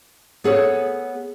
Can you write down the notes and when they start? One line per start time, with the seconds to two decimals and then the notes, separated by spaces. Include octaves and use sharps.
0.44 B3 G#4 A4 C#5